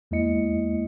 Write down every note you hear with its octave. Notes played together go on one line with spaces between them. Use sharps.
E2 G#3 A#3 E4 D#5 C#7